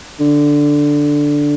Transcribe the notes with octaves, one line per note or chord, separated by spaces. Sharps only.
D3